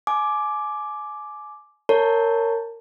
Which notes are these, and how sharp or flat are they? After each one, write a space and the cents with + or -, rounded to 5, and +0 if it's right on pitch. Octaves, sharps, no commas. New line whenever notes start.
G#5 +30 D6 +0
A#4 -20 C#5 +0 A5 +0